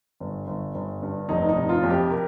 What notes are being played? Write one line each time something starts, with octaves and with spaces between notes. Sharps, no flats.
G1
G1
G1
G2
F1 D#4
D#4
C3
F4
F2
G4
A#4